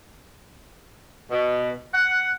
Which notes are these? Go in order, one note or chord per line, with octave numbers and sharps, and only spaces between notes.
B2
F#5